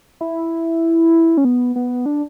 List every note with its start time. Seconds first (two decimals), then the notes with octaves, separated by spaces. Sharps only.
0.21 E4
1.37 C#4
1.45 B3
1.76 B3
2.06 D4